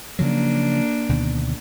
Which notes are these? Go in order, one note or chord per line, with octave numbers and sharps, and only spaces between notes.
C#3 F3 F#3 A#3 D4
D2 B2 D#3